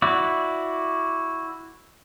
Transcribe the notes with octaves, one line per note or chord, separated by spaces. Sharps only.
E4 F#4 D5